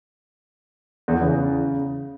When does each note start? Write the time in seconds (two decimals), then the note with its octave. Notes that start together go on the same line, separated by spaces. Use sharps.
1.08 E2
1.15 E3
1.23 C#3